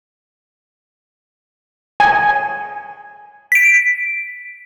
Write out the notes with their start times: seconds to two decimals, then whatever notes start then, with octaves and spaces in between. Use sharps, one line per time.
2.00 G#5
3.52 B6 D7